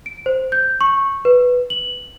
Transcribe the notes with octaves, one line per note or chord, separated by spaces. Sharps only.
D7
C5
G6
C#6
B4
F#7